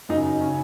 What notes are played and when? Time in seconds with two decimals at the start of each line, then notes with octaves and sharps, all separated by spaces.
0.09 F#2 D#4
0.13 C#3
0.41 C#4
0.45 C#3